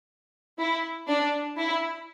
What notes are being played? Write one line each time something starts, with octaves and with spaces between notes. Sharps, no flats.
E4
D4
E4